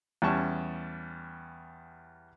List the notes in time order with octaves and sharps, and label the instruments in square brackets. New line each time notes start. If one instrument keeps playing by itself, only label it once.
[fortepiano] E2 G3 C#4 A5 C#6